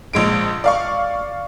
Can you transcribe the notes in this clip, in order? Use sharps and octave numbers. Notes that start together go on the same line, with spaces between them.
A#1 G#3 D7
D5 F5 C#6